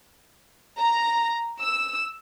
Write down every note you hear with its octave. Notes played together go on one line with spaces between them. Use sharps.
A#5
E6